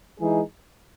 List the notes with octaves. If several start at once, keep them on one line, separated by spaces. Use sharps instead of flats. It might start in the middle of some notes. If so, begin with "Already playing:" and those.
E3 G#3 D#4 G#4